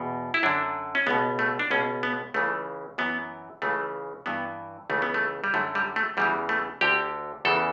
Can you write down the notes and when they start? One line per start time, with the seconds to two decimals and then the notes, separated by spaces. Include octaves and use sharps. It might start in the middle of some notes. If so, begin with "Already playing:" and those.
Already playing: E2 B2
0.34 E4
0.43 F#2 D3 D4
0.95 C#4
1.07 C#2 B2 B3
1.39 A3
1.59 D4
1.70 C#2 B2 C#4
2.03 B3
2.34 C#2 C#3 E3 A3
2.98 F#2 E3 B3
3.62 C#2 C#3 E3 A3
4.26 G2 E3 B3
4.90 C#2 C#3 E3 A3
5.02 B3
5.14 A3
5.44 G3
5.54 F#2 D3 A3
5.75 G3
5.96 A3
6.17 E2 C#3 E3 G3
6.49 A3
6.81 D2 D3 G4
7.45 E2 C#3 E3 A4